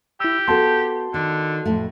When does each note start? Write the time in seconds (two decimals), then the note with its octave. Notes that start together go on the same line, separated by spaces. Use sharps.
0.20 E4 G4 E6
0.48 B3 F#4 A4 A5 C6
1.14 D3 D#3
1.65 F2 A2 A3